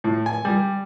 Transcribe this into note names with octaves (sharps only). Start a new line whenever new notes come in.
A2
G#5
G3